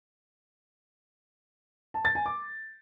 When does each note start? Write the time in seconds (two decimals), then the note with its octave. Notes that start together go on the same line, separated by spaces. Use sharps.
1.94 A5
2.05 A6
2.15 G#5
2.26 D6